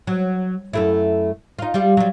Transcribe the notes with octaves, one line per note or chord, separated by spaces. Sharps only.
F#3
F#2 A3 E4
D#4 F4
G3 F4 G4
F#3 G3